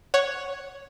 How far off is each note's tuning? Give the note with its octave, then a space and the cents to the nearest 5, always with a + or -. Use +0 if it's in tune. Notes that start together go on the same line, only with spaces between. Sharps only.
C#5 +0 F#5 +0